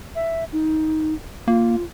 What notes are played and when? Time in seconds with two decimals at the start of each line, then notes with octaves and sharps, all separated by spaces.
0.15 E5
0.53 D#4
1.48 A#3 F4